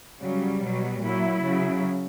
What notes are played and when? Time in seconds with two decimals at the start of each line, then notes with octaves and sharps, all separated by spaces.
0.21 C#3 F#3 G3
0.62 B2 F#3
1.02 A#2 F#3 E4
1.43 C#3 F#3